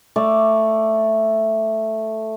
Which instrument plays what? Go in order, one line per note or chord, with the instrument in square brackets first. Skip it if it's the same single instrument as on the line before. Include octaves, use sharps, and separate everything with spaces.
[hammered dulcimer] A3 D5